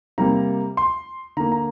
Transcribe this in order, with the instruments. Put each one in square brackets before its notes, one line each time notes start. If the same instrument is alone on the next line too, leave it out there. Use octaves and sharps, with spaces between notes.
[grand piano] C3 G3 A#3 A#5
C6
D3 A#3 A#5
A#5